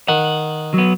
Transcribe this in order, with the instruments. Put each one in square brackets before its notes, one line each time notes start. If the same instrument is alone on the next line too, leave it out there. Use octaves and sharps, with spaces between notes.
[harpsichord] D#3 [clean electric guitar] F#5
[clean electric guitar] F#3 B3